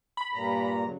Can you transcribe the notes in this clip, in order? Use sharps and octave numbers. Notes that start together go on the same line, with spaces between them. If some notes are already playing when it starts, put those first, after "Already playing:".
B5
G2 A#2 A#5
C#3 F#3